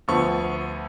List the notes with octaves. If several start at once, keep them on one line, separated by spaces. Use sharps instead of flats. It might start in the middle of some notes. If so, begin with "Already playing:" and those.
D2 D3 F3 B3 C#6